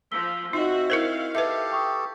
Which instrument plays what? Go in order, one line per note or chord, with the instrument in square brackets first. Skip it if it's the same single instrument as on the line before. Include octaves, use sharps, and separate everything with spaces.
[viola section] F3 [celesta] E6 B6 G7
[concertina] C4 E5 [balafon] D#4 [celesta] F4 D#5 [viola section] F#4
[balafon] E4 A#4 C5 [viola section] F5
[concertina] G4 A4 [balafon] B4 E5
[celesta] G5 C#6 D#6